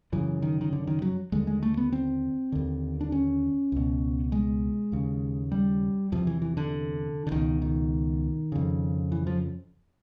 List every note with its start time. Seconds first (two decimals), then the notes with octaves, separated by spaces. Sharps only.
0.12 F#2 C#3 E3
0.42 D#3
0.61 D#3
0.73 D3
0.87 D#3
1.02 F#3
1.32 D#2 D3 G#3
1.47 G#3
1.63 A3
1.77 B3
1.92 C4
2.52 D#2 D3
3.01 D4
3.12 C#4
3.72 C#2 B2
4.32 G#3
4.92 D#2 C#3
5.52 G3
6.12 E2 C3 F3
6.27 E3
6.42 E3
6.57 D3
7.27 D3
7.32 C#2 B2 D#3
7.62 D#3
8.52 F2 C#3
9.12 E3
9.27 F3